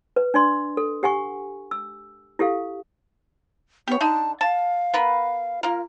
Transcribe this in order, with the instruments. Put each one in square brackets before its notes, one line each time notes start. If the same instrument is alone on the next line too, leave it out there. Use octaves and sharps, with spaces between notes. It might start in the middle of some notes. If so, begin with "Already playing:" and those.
[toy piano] B4
D4 D5 C6
A4
G4 F#5 G#5 C#6
E6
E4 G4 A4 F5
[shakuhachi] B3 [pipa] G4 C#5
[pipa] D3 D#4 [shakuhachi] A5
[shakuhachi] F5 [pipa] A5
[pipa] B3 A#4 B4
[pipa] A#3 A#4 [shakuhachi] F4